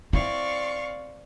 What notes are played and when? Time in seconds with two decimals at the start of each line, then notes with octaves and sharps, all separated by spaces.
0.13 C4 E4 D5 F5 C#6